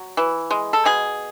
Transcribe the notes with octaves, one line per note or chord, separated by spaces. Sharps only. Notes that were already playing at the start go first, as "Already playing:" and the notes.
Already playing: F#3
E3
G#3
A4
B2 G#4